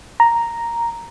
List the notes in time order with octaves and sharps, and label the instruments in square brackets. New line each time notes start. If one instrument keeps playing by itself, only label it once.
[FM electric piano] A#5